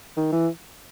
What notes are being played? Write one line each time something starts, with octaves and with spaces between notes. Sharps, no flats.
D#3
E3